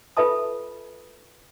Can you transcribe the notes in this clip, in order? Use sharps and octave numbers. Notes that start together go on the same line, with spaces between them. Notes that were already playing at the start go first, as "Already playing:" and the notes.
F4 A4 B4 E5 A5 D#6